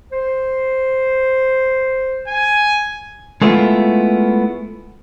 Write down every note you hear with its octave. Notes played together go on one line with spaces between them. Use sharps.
C5
G#5
G#3 A3 B3 E4 F4